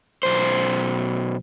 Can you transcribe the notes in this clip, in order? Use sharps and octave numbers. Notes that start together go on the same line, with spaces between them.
B1 C5